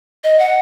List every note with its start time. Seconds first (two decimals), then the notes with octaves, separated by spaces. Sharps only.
0.24 D#5
0.39 F#5